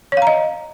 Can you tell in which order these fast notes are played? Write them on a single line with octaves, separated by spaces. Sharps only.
C#5 F5 A#5 D#5